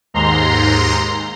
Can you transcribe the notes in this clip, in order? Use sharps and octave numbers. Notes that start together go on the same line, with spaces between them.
D#2 G#2 A#5 C6